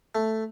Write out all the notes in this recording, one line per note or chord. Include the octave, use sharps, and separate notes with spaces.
A3